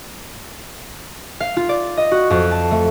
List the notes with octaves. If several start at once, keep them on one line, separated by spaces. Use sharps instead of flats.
F5
F4
D5
D#5
F#4
F2
A5
A3